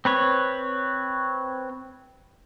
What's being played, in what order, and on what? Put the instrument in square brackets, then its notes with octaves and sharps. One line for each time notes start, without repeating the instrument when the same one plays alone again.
[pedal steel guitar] C4 B4 C#5